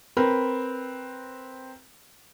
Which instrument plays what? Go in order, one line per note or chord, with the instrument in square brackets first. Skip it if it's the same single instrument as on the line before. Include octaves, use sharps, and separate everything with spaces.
[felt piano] C4 A#4 B4